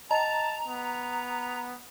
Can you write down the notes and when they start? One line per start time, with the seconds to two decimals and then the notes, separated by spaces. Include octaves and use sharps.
0.11 D#5 G5 A5 A#5
0.67 B3